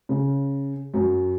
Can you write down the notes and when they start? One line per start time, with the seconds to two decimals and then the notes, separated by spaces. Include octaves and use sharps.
0.09 C#3
0.94 F#2